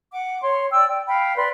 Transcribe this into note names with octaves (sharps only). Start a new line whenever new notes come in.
F#5 D6
C#5 C6
D5 G5 E6
G5
F5 G5 B5
B4 D5 C6